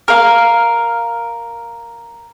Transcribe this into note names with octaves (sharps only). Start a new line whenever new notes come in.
A#4 F5